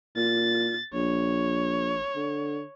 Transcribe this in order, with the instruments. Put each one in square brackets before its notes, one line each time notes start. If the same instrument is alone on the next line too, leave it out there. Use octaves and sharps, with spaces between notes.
[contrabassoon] A#2 [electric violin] A6
[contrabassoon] A#1 [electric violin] C#5
[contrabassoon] D3